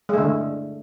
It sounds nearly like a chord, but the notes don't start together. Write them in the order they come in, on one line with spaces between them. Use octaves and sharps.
G#3 A3 D3